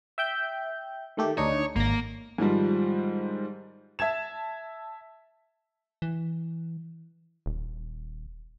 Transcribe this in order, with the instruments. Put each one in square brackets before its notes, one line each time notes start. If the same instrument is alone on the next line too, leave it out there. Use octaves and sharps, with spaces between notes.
[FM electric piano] E5 G5 G6
D#3 A3 G4
[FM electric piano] D2 D4 D#4 [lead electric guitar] C#5
[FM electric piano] G#1 A#6 [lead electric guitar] A#3
[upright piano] G#2 D#3 F3 G3
E5 A5 G#6 E7
[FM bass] E3
[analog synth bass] D#1